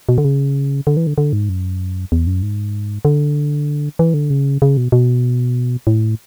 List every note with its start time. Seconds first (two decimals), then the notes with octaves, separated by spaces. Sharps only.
0.09 B2
0.18 D3
0.25 C#3
0.87 D3
0.97 E3
1.07 D3
1.18 D3
1.33 G#2
1.49 F#2
2.12 E2
2.27 F#2
2.42 G#2
3.05 D3
3.99 E3
4.14 D3
4.30 C#3
4.62 C#3
4.77 B2
4.92 B2
5.87 A2